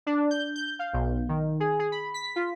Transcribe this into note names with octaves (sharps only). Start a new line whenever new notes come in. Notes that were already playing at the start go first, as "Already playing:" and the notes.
D4
G6
G6
F5
B1
D#3
G#4
G#4
B5
B6
F4